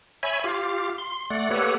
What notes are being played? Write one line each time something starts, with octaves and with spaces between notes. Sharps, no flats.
C#5 E5 G#5 B5
F4 G4 F5
C6
A3 D5 F#5
A#3 G4 A4 B4 C#5 F#5